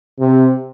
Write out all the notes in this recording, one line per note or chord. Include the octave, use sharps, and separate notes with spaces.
C3